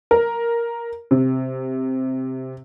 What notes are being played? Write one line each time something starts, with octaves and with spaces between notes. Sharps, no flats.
A#4
C3